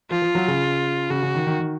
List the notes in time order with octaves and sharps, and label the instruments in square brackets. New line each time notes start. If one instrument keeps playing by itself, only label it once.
[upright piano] F3 [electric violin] F4
[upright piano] F3
F#3
C#3
[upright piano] C#3 [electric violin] F#4
[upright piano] C#3
D#3
D#3
D#3